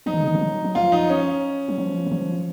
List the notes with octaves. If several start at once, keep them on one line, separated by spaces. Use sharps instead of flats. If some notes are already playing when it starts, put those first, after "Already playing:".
F3 D#4
D#3
C#3
D#3
F3
F#3
F#3
F3 F4
D#4
C#4
F#3
F3
D#3
F3